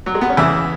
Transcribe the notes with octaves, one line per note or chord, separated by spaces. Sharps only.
F#3
G#3
B3
C#4
E2 C#3 E3 E4